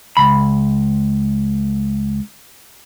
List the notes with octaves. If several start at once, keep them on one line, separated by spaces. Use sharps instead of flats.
C#2 B5